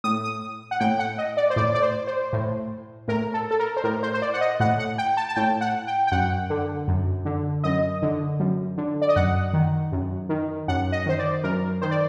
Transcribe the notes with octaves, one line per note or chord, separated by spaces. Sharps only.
A2 D#6
D#6
F#5
A2 G5
F#5
D#5
D5
C5
A2 D5
D5
C5
C5
A2
A2 A#4
A4
A4
A#4
C5
A2 A#4
C5
C5
D5
F#5
D#5
A2 F#5
F#5
G5
A5
A5
A2 G5
F#5
G5
G5
F#2 F#5
D3
F#2
D3
F#2 D#5
D3
F#2
D3
D5
D#5
F#2 F#5
D#3
F#2
D#3
F#2 F#5
D#5
D#3 C5
D5
F#2 A#4
D#3 C5
D5